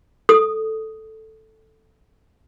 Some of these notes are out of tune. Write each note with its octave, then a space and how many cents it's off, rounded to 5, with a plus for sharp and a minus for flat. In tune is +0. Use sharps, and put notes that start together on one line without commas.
A4 +0 D#6 +0